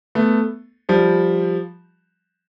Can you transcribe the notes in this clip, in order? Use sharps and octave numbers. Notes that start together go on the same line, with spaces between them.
A3 B3
F3 G3